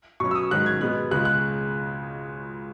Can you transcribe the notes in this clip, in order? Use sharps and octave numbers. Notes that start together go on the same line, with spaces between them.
B2 F#3 C#4 C#6
E6
D#6
G#2 D#3 F#3 C#4 F#6
G#6
B2 G#3 B3 F#6
C#2 C#3 G#3 C#4 F#6
F#6